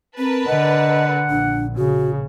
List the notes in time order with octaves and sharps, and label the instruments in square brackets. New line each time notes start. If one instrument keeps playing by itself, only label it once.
[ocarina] C4 [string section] A#4 B4 A5
[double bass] D3 [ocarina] D#5 [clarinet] F#5
[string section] A#1 [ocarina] D4
[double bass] C#3 [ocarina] F#4